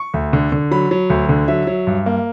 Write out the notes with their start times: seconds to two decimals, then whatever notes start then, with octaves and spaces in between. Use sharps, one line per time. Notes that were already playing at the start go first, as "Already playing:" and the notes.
Already playing: C#6
0.14 D2
0.33 D3
0.52 D3
0.71 F#3 B5
0.91 F#3
1.10 D2
1.29 D3
1.48 F#3 E5
1.67 F#3
1.87 G2
2.06 A#3